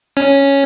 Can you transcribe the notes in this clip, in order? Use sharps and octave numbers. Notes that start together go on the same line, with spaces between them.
C#4